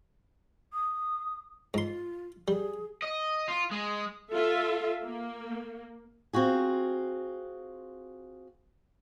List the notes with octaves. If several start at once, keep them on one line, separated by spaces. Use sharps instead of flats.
D#6
G#2 F4 C6
G3 G#4
D#5
F4
G#3
F4 A4 E5
A#3
C4 F4 F#4 G#4